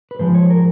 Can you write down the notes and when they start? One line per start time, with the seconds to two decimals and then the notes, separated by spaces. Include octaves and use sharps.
0.11 B4
0.19 G#2 F3 G#3 C5
0.34 C#5
0.50 A#4